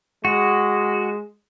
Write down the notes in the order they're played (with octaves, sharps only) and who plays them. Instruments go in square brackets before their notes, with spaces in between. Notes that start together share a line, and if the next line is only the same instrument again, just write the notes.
[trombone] G#3 [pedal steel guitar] F#4